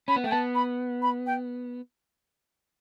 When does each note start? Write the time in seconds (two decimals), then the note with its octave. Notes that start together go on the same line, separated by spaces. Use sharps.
0.08 C#4 B5
0.16 B3
0.24 A3 G5
0.31 B3 A5
0.55 B5
1.02 B5
1.26 G5